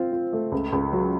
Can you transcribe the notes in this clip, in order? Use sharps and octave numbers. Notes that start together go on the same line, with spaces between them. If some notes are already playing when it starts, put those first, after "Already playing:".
Already playing: C4 F4
F4
A3
C#2
C#2
F#3